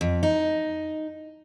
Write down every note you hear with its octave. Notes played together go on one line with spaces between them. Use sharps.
F2
D#4